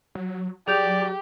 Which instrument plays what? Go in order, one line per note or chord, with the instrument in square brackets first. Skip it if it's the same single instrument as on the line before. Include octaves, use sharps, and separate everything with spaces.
[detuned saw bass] F#3
[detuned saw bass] F#3 [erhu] G4 [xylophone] G#4 G6 F7 [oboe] D5